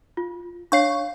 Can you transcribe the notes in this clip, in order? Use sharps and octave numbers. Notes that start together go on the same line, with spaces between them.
F4
D4 C#5 F5 C#6 C7